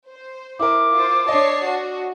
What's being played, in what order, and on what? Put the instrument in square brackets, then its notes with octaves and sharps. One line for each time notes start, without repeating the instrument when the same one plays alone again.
[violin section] C5
[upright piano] E4 A#4 [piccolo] D6
[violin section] F4 C5
[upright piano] D4 D#5 [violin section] C#5 A5 C7
[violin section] F#4